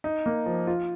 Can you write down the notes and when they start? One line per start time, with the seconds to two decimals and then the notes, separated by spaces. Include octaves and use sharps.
0.04 D#4
0.26 A#3
0.46 F3
0.67 F4